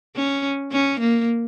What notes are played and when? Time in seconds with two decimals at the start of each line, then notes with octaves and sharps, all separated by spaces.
0.16 C#4
0.72 C#4
1.00 A#3